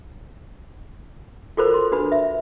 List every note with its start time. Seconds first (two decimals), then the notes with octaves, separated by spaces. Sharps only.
1.57 F4 F#4 A4 A#4 C5 B5
1.74 C6
1.92 D4 F#4 B4 B5
2.12 E5